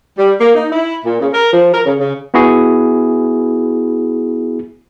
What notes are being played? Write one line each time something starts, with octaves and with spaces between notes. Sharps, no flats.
G3
A#3
D#4
E4
A#2
C#3
A#4
F3
A#4
C#3
C#3
B3 E4 F#4 G#4